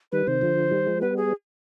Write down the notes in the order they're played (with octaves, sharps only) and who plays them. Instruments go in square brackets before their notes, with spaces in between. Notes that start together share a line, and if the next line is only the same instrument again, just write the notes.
[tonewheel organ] D#3 G3 [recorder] B4
[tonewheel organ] C3 D#3 [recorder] C5
[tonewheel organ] D3 F3
D#3 G3
F3 G#3
[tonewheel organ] G3 B3 [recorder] B4
[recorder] G#4